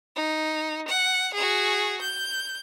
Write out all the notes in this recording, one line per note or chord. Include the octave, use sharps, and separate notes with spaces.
D#4
F#5
F#4 G#4
G6